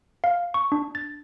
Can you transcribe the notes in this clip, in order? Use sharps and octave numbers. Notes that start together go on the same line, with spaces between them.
F5
C#6
D4
A6